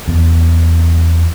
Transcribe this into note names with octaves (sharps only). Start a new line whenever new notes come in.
E2